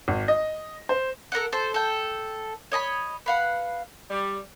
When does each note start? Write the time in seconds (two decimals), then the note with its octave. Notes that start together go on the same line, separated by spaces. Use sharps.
0.08 G#1
0.28 D#5
0.89 C5
1.32 A4 A#4 C5 F#5
1.53 A4 C5
1.74 A4 G5
2.72 C#5 D#5 A#5 B5
3.26 B4 F5 F#5
4.09 G3